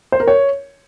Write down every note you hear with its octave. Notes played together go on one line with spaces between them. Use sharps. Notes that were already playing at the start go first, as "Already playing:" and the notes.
C5
A#4
C#5